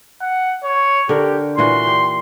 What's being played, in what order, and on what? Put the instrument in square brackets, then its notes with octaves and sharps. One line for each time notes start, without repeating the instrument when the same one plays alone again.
[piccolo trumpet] F#5
C#5
[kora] D3 A#4 [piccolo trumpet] G4
[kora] A#2 E3 F#4 [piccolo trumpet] C6
[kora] G4